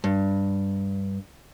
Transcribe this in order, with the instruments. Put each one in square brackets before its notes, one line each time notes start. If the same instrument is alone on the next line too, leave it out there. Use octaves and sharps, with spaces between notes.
[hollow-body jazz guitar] G2